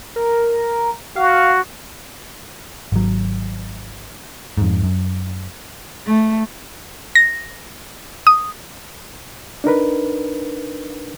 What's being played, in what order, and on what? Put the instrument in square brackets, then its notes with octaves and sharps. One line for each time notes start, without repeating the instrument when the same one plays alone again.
[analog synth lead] A#4
[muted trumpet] F#4 [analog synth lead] F5
[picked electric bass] G#1 F#3
F2 G#2
F#2
[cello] A3
[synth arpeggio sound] A#6
D#6
[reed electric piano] D4 D#4 A#4 B4